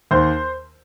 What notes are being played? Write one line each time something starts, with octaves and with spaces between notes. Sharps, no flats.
D#2 C5